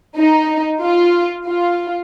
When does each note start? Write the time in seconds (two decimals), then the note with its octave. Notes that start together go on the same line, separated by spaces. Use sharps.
0.17 D#4
0.82 F4
1.47 F4